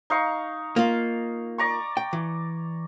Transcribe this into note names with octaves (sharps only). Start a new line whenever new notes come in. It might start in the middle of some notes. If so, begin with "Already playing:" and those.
D#4 F5 C#6
A#3 F4
D5 A#5 C#6
G5
E3